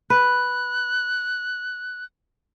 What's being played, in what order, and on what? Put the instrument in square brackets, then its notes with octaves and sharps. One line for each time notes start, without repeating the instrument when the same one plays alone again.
[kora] B4 [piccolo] F#6